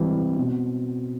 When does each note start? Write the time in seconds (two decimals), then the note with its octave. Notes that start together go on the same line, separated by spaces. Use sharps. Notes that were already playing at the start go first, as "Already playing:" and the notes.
Already playing: E3 G3 C4
0.12 E3
0.36 B2